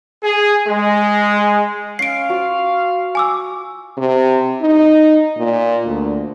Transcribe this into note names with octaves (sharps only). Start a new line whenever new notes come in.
G#4
G#3
C#4 F5 C7 D7
F4 F#4 C5
G#5 D6 E6
C3
D#4
A#2
D2